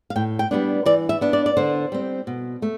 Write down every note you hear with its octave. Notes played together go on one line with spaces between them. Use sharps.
F5
A2 G5
G5
G3 B3 D4
E3 D5
E5
B3 D4
D5
D5
D3 C5
G3 C4
B2
A3